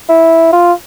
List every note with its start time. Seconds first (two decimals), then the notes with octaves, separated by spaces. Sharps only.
0.09 E4
0.53 F4